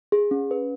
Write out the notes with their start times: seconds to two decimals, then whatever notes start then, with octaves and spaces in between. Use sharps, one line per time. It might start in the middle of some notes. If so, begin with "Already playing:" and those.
0.12 G#4
0.31 C#4
0.51 B4